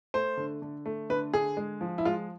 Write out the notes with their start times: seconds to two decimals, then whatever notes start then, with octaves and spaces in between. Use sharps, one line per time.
0.14 A3 C5
0.37 D3
0.62 D3
0.86 A3
1.10 D3 B4
1.34 D3 G#4
1.57 G#3
1.81 F3
1.98 E4
2.05 G#3 F4